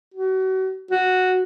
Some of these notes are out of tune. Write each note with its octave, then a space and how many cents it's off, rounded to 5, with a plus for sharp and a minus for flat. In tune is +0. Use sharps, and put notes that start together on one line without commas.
F#4 +35
F#4 -5